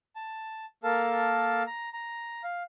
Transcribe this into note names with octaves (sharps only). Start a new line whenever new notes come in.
A5
A#3 A4 A#4 F5 A5
A#5
A#5
F5